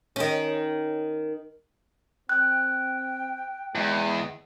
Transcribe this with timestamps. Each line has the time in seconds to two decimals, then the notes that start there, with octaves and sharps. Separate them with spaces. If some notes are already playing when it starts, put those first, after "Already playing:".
0.16 D#3 C#4
2.29 C4 G5 F#6
3.75 E2 G#3